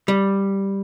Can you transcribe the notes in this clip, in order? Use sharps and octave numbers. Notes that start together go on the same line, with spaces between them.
G3